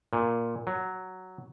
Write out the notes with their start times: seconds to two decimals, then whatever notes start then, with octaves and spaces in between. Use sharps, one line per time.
0.13 A#2
0.67 F#3